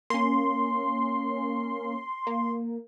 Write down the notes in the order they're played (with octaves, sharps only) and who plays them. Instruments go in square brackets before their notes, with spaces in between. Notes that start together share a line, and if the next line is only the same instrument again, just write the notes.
[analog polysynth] A#3 C#4 [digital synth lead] C6
[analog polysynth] A#3